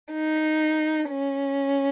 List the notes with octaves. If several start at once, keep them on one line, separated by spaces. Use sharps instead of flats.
D#4
C#4